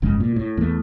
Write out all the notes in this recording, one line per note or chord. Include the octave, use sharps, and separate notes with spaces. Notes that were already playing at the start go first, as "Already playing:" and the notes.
G1 F2 C#3 G#3
A#2
A2
E2 A3